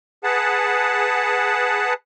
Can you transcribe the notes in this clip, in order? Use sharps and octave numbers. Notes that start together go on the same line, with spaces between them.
G#4 B4 F#5 A5